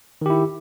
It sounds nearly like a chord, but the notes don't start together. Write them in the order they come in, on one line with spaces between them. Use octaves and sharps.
D#3 G4 E4